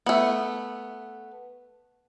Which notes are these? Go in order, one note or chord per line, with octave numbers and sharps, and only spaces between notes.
A3 B3